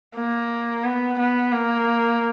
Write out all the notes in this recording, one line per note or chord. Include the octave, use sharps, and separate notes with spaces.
A#3
B3
B3
A#3